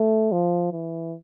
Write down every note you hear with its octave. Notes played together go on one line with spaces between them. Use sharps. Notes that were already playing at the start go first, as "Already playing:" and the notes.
Already playing: A3
F3
E3